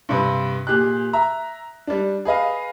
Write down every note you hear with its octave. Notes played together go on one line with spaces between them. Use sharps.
G2 C3 B4
A#2 G4 G#4 F#6
E5 A#5
G3 D4
G#4 B4 D#5 F5